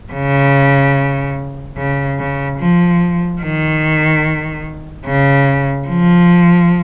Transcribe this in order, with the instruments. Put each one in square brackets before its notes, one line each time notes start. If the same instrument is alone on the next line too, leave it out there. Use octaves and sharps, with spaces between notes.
[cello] C#3
C#3
C#3
F3
D#3
C#3
F3